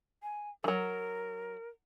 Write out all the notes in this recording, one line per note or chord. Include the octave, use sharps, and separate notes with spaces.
G#5
E3 F#3 A#4